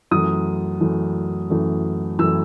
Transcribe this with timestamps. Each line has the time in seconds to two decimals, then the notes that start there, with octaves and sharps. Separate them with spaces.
0.11 F#2 E3 A3 D#6
0.81 F#2 E3 A3
1.50 F#2 E3 A3
2.19 F#2 E3 A3 E6